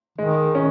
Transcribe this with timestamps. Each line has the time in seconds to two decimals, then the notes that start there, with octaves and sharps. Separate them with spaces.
0.18 D#3 G#3
0.55 C#4